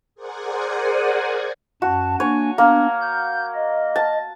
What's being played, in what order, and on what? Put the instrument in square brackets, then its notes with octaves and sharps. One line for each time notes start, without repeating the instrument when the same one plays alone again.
[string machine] G#4 A#4 C5 D5 F#5 G#5
[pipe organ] F#2 A5 [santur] F#4
[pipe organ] A#3 D4 G#5 [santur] C#5
[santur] A#3 [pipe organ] B3 D4
[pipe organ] G6
D#5
[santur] A5